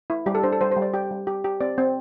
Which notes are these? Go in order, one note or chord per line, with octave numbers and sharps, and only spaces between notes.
E4
G3 G4
A4
D4 C5
A4
G3 C5
C5
G3
D5
G4 G5
G3
G4
G4
C4 D5
C4